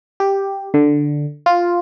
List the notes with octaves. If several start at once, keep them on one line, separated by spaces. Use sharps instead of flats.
G4
D3
F4